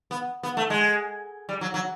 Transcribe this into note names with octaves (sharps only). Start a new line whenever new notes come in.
B3
B3
A3
G#3
G3
F#3
F#3